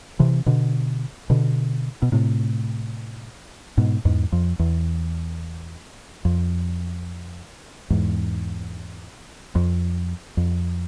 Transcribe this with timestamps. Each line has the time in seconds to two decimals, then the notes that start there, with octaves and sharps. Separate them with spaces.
0.19 C3 E3
0.46 B2 D3
1.30 B2 D3
2.02 B2
2.12 A2 C3
3.77 G#2 B2
4.05 E2 G#2
4.32 F2
4.59 E2
6.25 F2
7.90 E2 G#2
9.55 F2
10.37 F2